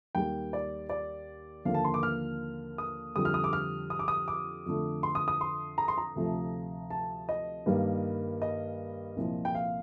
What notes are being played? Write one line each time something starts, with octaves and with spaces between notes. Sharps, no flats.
D#2 D#3 G3 G5
D5
D5
D#2 D3 F3 A#3 F5
A5
C6
D6
F6
D#6
F2 D3 G3 D#6
F6
D#6
D6
F6
D#6
D6
D#6
D6
F2 D3 A3
C6
D#6
D#6
C6
A#5
C6
A#5
D2 C3 F3 A3
A5
D#5
G2 D#3 G3 A#3
D#5
C2 A#2 F3
G5
F5